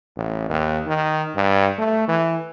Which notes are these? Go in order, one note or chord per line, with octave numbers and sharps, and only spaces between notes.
A1
D#2
D#3
G2
A3
E3